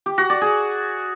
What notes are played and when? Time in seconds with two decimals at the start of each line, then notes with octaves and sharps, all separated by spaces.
0.06 G4
0.18 F#4
0.30 D5
0.41 G#4